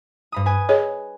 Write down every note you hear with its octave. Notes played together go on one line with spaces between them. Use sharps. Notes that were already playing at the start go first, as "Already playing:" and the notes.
G2 B5 D#6
B4 G#5 D#7
G#4 C#5 D#5